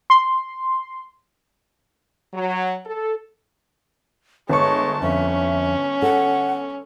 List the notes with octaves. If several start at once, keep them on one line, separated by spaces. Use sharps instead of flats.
C6
F#3
A4
G1 G#3 C#5 A5 C#6
F2 C#4 E5
A4 F#5